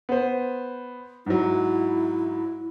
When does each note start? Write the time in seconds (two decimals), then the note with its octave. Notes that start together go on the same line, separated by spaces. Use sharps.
0.09 B3 C5
1.26 G#2 F#3 E4